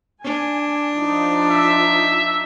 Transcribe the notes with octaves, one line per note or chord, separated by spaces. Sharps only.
D4 G#5
F3 D#4
E5